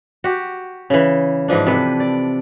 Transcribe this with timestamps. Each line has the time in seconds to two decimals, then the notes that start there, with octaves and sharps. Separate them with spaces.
0.24 F#4 G4
0.90 C#3 E3
1.48 G#2 E3 F3 D4
1.67 C3 A4 B4
2.00 D5